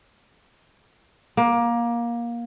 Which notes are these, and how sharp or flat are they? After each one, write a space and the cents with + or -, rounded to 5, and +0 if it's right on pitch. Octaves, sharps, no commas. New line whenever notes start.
A#3 +20